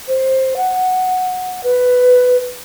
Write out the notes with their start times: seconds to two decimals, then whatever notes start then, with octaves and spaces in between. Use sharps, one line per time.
0.08 C5
0.57 F#5
1.64 B4